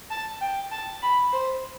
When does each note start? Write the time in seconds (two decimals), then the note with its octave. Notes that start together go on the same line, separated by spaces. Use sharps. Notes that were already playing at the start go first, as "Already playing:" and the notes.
0.10 A5
0.41 G5
0.71 A5
1.02 B5
1.33 C5